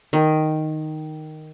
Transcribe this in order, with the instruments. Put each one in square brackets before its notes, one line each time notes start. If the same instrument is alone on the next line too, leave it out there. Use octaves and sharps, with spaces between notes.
[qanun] D#3